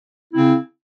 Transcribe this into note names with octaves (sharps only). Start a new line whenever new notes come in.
C#3 C4 E4